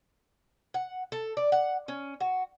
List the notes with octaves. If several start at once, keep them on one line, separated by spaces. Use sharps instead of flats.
F#5
A4
D5
F#5
C#4
F#4